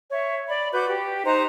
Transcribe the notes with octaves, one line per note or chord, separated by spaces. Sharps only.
C#5 E5
D5 B5
F#4 B4 D6 G6
G4
D#4 C5 A#5 F#6